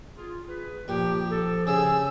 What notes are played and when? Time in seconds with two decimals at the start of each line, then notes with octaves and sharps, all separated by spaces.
0.17 F4 G#4
0.48 G#4 B4
0.88 A#2 F3 G4
1.30 A4
1.67 C#3 G4 G#4 E6